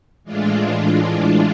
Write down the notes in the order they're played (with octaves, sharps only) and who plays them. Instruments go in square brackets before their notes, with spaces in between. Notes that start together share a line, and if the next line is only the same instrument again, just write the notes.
[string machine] A2 E3 G#3 D4 F4